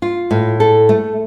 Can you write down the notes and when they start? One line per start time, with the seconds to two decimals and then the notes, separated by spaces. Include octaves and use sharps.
0.02 F4
0.31 A2
0.60 A4
0.89 A3